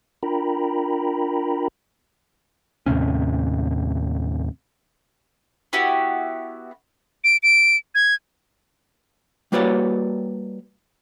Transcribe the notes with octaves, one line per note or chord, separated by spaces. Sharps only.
D4 F4 A#4 G5 A#5 B5
D#2 A2 C3 C#4
B3 E4 F#4 G4
D7
D7
G#6
G3 A#3 F#4 B4 C#5 D5